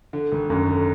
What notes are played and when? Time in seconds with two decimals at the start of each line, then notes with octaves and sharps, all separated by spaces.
0.13 D3
0.32 G#1
0.50 F#2
0.68 D3